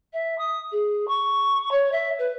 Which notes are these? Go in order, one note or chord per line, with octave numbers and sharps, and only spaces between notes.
E5
D#6
G#4
C#6
C#5
E5
B4